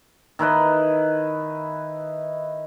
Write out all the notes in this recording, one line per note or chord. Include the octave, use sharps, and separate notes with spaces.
D#3 E4 B4 D#5